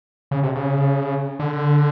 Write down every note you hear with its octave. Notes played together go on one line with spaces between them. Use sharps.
C#3
C3
C#3
D3